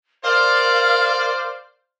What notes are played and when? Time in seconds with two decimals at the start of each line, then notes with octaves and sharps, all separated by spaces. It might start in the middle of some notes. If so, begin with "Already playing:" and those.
0.24 A#4 C5 D5 F5